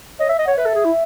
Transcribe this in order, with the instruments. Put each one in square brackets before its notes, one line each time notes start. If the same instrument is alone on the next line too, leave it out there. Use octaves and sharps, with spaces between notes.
[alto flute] C#5 [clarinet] D#5
[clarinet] E5
D#5
[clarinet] C#5 [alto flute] F#5
[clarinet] B4 [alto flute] E5
[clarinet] A4
G#4
E4